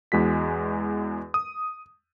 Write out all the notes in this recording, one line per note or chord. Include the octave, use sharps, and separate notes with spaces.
E2 G#3 F#4 B6
D#6